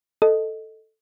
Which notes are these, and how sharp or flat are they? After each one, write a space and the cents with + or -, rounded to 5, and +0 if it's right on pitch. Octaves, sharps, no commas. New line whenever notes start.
A4 +0 D#5 +0